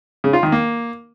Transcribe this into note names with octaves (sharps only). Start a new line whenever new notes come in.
C#3
F4
D#3
A#3